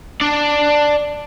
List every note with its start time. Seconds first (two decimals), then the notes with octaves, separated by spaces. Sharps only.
0.21 D4 D5